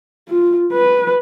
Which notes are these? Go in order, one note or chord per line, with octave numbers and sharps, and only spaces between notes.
F4
B4